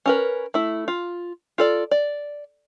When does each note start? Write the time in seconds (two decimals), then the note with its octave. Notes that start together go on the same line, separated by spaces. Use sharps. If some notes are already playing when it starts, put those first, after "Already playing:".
0.06 C#4 A#4 B4
0.54 A3 E4
0.88 F4
1.58 F4 A4 D5
1.91 D5